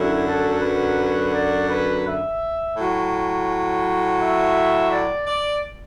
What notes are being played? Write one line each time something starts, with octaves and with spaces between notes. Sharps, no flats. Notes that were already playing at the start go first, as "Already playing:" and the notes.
Already playing: F#2 D3 F#3 E4
A4
B4
D5
B4
E5
A2 F#3
E5
D5
D5